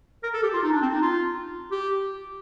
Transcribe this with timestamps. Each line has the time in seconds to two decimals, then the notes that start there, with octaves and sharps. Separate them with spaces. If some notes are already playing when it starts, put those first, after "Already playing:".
0.23 A#4
0.33 A4
0.43 G4
0.53 F4
0.63 D#4
0.72 D4
0.82 C4
0.92 D#4
1.02 F4
1.71 G4